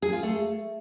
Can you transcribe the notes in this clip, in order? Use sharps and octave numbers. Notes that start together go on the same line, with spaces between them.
G#4
F4
A3